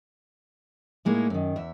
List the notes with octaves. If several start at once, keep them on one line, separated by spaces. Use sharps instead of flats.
A2 G#3 A#3 D#4 E4
F#2 D#3
E2 E5